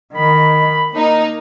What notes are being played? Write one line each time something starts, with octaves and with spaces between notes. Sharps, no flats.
D#3 B5
A#3 D#4